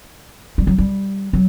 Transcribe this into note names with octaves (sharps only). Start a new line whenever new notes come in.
G3
F#3
G3
F#3